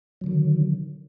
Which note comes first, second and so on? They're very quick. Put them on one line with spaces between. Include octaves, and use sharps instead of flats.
F#3 D3 D#3